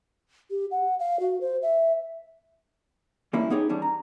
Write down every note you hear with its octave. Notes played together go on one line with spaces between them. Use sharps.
G4
F#5
F5
F#4
C5
E5
E3 G3 A#3 C#4 E4
B3 C#4 D#4 G4 G#4 C#5
E3 G3 C#4 D4
A#5